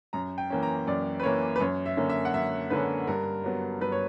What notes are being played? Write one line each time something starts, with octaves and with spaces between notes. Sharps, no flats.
F#2 A#5
G5
E3 A#3 C#4
A#5
F#2 D5
B4
E3 A#3 C#4 C#5
B4
F#2 C#5
E5
D3 A#3 C#4
E5
F#5
F#2 E5
D3 A#3 C#4 B4
G2 A#4
F#3 B3
G2 B4
C#5